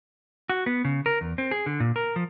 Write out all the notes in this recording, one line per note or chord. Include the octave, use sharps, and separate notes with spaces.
F#4
B3
C#3
A#4
E2
C4
G#4
D3
A#2
A#4
F3